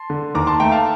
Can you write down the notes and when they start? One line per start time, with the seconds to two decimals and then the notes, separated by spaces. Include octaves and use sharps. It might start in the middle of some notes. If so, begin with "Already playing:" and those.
Already playing: A5 C6
0.10 D3
0.35 D#2 A#5 D6
0.47 A5 C6
0.60 A3 G5 A#5
0.72 F5 A5